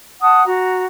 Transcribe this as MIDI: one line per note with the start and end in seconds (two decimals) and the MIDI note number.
0.20 0.42 78
0.20 0.42 81
0.20 0.42 87
0.44 0.83 66
0.44 0.83 82